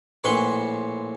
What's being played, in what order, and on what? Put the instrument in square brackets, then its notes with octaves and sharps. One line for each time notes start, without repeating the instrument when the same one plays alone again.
[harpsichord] A#1 A2 B4 G#5 C6 C#6